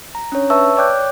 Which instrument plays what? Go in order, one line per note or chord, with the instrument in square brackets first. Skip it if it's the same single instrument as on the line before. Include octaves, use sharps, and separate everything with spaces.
[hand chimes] A#5
C#4 D4 C#5
B4 E5 A5 C#6 E6
C#5 D5 G5 D6 F#6 G6